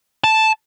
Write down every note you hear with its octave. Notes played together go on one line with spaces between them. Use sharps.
A5